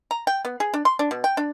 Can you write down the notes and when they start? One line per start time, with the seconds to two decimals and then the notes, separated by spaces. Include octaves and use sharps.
0.11 A#5
0.27 G5
0.45 B3
0.60 G#4
0.74 D4
0.85 C6
0.99 D4
1.11 B2
1.24 G5
1.37 D4